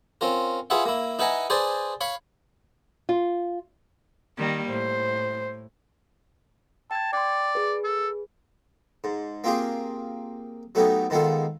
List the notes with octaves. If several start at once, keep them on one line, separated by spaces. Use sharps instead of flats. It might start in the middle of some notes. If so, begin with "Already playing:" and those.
C4 C#4 F4 A#4
E4 F4 G#4 B4 E5 F#5
A#3 E4
D#4 E4 B4 F#5 G#5 A#5
G#4 B4 C5 D5 G#5 A5
C#5 F5 B5 C#6
F4
D#3 G3 A#3
A2 C5
G5 A5 G#6
D5 G5 C6
G#4 B4
A4
G#2
A#3 C4 F4 G4 G#4
F#3 A3 B3 D#4 G4
G#2 D#3 B3 F4 A4